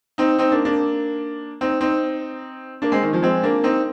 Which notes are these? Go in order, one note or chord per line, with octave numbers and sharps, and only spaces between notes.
C4 D#4
C4 D#4
A#3 D4
A#3 D4
C4 D#4
C4 D#4
A#3 D4
G#3 C4
D#3
F3
G#3 C4
A#3 D4
C4 D#4